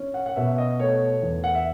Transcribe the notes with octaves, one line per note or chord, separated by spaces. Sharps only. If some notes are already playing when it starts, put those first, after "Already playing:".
Already playing: C#4
F#5
F#5
B2 E5
D#5
A3 C#5
E2
F#5
E5